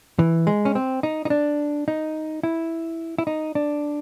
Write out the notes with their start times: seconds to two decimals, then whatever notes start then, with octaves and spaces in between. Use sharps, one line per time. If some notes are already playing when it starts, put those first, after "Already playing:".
0.19 E3
0.47 G#3
0.65 C#4
0.75 C4
1.03 D#4
1.25 D#4
1.30 D4
1.88 D#4
2.43 E4
3.19 E4
3.27 D#4
3.55 D4